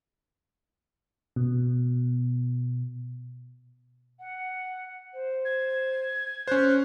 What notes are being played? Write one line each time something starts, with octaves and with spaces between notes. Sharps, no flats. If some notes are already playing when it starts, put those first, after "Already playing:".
B2
F#5
C5
G#6
C#4 C5 F#6